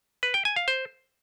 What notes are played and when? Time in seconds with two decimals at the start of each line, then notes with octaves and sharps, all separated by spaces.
0.23 B4
0.34 G5
0.45 G#5
0.56 F5
0.68 C5